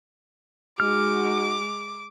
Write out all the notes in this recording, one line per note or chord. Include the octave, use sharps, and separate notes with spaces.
G#3 D#4 F#4 D6 F6